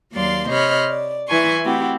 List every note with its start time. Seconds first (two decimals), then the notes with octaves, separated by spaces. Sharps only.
0.13 D#2 F#3 A#3 D5 F5 C6
0.48 C3 C5 C#5 D#5 B5 F6
0.88 D5
1.28 E3 E4 B4 G#5 C6 C#6
1.64 A3 C4 E4 F#4 G4